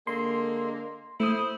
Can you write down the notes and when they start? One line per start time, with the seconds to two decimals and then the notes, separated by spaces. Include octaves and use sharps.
0.07 D3 G#3 A#3 C6
1.20 A3 E4 C5 D#6